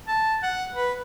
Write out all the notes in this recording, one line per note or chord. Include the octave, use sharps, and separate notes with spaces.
A5
F#5
B4